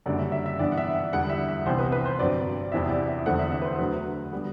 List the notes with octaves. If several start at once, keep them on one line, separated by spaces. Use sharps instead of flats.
F#1 F#2 D3 G3 D5
E5
E5
E5
G2 E3 B3 D5
F#5
E5
E5
E2 D3 G3 F#5
E5
E5
C2 C3 E3 B3 C5
B4
B4
C5
G1 G2 F#3 C4 D5
E2 C3 E3 B3 E5
D5
E5
E2 D3 A3 C4 F#5
E5
E5
B4
C5
D2 D3 F#3 B4
D3 G3 B3